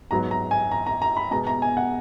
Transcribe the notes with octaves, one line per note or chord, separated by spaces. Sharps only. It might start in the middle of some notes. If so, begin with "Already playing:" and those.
G#2 F#3 B3 A#5
A#5
G#5
A#5
A#5
A#5
B5
B2 G#3 B3 A#5
A#5
G#5
F#5